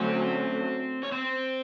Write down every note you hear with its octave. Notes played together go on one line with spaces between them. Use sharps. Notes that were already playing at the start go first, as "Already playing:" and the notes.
Already playing: D3 F#3 A3 C4 C#4 C5
C#5
C4 C5